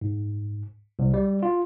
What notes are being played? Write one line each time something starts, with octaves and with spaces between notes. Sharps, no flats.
G#2
C2
G3
F4